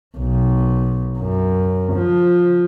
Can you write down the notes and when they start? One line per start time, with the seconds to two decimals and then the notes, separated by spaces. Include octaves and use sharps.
0.18 B1
1.19 F#2
1.93 F3